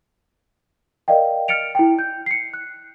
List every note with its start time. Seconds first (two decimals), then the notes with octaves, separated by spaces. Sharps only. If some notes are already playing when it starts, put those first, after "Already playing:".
1.08 A#4 D5 D#5 F5 G5
1.48 F6 A6 C#7 D7 F7
1.75 E4 G5
1.99 G6
2.26 C7 C#7
2.54 F#6